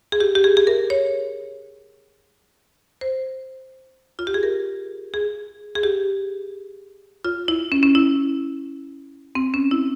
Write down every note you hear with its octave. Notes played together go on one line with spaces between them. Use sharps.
G#4
G4
G4
G#4
G#4
A#4
C#5
C5
F4
G4
G#4
A#4
G#4
G#4
G4
F4
E4
C#4
C#4
E4
C4
C#4
E4